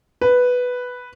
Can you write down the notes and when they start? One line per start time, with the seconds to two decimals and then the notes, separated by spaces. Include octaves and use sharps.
0.21 B4